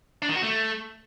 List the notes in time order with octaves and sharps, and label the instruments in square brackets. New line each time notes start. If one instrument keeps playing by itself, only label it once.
[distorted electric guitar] D4
D#3
F#4
A3